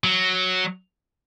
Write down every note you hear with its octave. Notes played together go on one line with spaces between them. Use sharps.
F#3